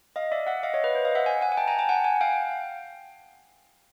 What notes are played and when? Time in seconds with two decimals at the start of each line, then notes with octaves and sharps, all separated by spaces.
0.16 D#5 F5
0.32 D5 E5
0.47 E5 F#5
0.63 D#5 F5
0.74 C#5 D#5
0.84 B4
0.95 C5
1.05 D#5 F5
1.15 E5 F#5
1.26 F#5 G#5
1.41 F#5 G#5
1.52 G#5
1.57 G5 A5
1.68 G#5 A#5
1.79 G5 A5
1.89 F#5 G#5
2.04 F#5 G#5
2.21 F5 G5